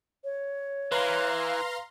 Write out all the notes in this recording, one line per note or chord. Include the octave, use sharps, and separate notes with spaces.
C#5
E3 B4 F5 A#5 C6